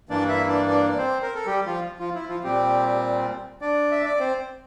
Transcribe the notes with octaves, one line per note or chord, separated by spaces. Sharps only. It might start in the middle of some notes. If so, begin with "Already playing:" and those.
G2 E3 A#3 D4 D5
E4 E5
D4 D5
D4 D5
D5
C4 C5
A#4
A4
G3 G4
F3 F4
F3 F4
E4
F3 F4
A#2 G3 C4 G4
D4 D5
E5
D5
C4 C5